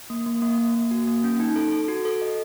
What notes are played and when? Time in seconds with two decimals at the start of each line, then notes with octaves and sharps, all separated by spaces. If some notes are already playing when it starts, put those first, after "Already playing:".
0.10 A#3
0.26 A#3
0.42 A#3
0.58 A#3
0.75 A#3
0.91 F#4
1.07 A#3
1.24 C#4
1.40 D#4
1.56 A4
1.72 A4
1.88 F#4
2.05 A4
2.22 D#5